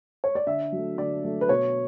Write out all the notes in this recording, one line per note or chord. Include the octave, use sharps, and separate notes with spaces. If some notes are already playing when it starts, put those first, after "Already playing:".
C#5
D5
D3 E5
F#3 A3
D3 D5
F#3 A3
B4
B2 C#5